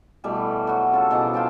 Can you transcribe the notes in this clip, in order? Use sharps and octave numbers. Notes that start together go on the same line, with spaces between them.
B2 E3 G3 A3
F#3 F#4
C#3 F4 A4
B2 E3 F3 A#5
F4 G5 A5